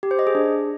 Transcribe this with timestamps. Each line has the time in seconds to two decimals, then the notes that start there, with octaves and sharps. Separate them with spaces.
0.03 G4
0.11 C5
0.19 D#5
0.27 G#4
0.35 D4